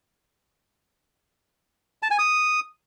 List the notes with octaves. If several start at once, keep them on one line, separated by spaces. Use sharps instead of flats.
A5
G#5
D#6